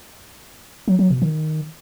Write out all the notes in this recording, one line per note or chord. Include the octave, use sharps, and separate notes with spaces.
F#3
F#3
B2
D#3